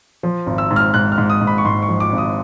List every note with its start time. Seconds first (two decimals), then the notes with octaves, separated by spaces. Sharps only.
0.23 F3
0.46 G#1
0.58 E6
0.71 G#2
0.76 F6
0.94 G#2 F#6
1.12 F6
1.18 G#2
1.30 D#6
1.41 G#2
1.47 B5
1.58 C#6
1.65 G#2 C6
1.83 C#6
1.89 F3
2.00 D6
2.12 G#1
2.18 D#6